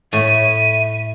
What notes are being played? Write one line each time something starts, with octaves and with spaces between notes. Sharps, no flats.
A2 E5 D#7